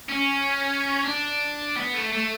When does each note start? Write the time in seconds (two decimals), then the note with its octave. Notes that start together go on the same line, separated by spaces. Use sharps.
0.09 C#4
1.05 D4
1.77 B3
1.94 A3
2.12 A3